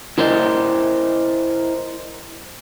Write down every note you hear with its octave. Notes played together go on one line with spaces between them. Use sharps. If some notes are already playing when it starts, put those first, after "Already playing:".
E4 A#4 C5 D5 D#5